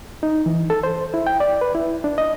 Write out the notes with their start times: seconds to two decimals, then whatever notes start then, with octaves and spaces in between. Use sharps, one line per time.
0.23 D#4
0.46 E3
0.70 A4
0.83 C5
1.14 E4
1.27 G5
1.40 D5
1.61 B4
1.75 E4
2.04 D4
2.18 D#5